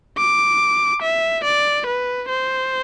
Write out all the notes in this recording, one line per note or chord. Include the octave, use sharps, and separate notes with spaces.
D6
E5
D5
B4
C5